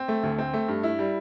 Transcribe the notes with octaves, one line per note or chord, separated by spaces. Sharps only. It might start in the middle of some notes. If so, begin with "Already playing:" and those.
Already playing: C4
A3
D2
C4
A3
G2
E4
G3